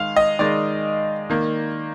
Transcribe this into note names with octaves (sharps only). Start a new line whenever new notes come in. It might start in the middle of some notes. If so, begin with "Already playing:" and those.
Already playing: D#3 G#3 F5
D#5
D#3 G#3 D5
D#3 A#3